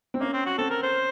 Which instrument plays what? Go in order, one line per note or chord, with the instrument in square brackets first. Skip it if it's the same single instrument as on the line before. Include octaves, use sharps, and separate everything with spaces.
[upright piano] C4
[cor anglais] A#3 [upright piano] C#4
[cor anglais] C4
F#4
[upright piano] C4 [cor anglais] A4
[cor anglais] A#4
C5